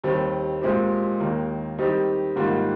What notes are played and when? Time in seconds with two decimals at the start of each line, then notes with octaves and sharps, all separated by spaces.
0.04 D#2 D#3 G3 C4
0.62 A#2 G#3 C4 G4
1.20 D#2 D#3 A#3
1.78 D#3 G3 C4 D#4 G4
2.36 G#2 D#3 G3 A#3 F4